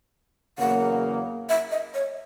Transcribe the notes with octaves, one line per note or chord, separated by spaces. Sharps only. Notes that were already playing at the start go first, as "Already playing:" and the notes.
E2 C#3 F#3 A#3 F#5
E5
D#5
C#5